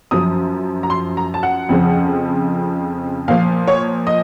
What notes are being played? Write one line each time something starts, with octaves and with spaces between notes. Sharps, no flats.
F#2 F3 D#6
A#5
C6
A#5
A5
F#5
F2 C#3 F3
A#2 F3 F5
C#5
D#5